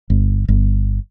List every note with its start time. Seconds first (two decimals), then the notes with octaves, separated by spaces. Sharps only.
0.10 G1
0.48 G1